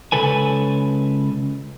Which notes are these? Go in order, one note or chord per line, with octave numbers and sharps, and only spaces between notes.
C#2 C#3 A4 B4 G#5